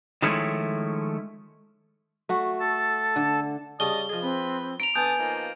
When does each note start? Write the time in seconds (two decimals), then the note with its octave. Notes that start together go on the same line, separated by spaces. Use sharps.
0.22 D#3 F3 G#3 A3 C#4 E4
2.29 A3 F#4
2.60 A4 A5
3.16 D3
3.80 C#3 G3 D#5 A5 D#6 G7
4.09 F3 G#4 D#5
4.22 C4 B4
4.80 A#5 B5 D7 F7
4.96 D3 B3 G#5 A5 D#6 G6
5.19 F3 A#3 D#4